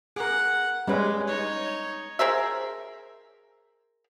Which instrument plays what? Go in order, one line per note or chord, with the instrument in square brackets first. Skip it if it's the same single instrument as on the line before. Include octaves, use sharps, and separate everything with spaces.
[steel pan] G#4 A#4 [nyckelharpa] F#5
[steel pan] G3 C#4 B4 [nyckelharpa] G#3
[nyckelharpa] D#4 C#5
[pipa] G#4 A#4 C5 E5